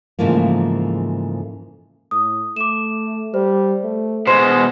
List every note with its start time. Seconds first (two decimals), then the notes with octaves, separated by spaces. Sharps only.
0.19 G#2 C#3 E3 F3 A3 A#3
2.11 A2 D#6
2.56 A3 D6 E7
3.34 G3 C5
3.84 A3
4.27 B2 G#3 B3 C5 C6 E7